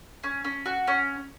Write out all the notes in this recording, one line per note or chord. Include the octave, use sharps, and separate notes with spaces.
C#4
C#4
F#4
C#4